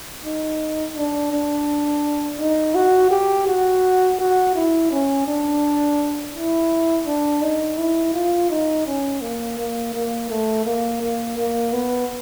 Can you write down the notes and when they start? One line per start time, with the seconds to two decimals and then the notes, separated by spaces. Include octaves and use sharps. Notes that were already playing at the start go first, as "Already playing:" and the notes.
0.25 D#4
0.96 D4
1.33 D4
2.40 D#4
2.75 F#4
3.11 G4
3.47 F#4
4.19 F#4
4.55 E4
4.91 C#4
5.27 D4
6.35 E4
7.07 D4
7.42 D#4
7.78 E4
8.14 F4
8.50 D#4
8.86 C#4
9.21 A#3
9.58 A#3
9.94 A#3
10.30 A3
10.65 A#3
11.01 A#3
11.37 A#3
11.73 B3